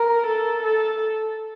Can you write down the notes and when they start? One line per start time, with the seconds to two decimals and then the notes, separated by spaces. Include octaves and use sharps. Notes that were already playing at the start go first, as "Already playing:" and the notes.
Already playing: A#4
0.26 A4
0.63 A4